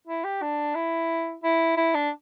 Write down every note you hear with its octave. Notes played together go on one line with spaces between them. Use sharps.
E4
G4
D4
E4
E4
E4
D4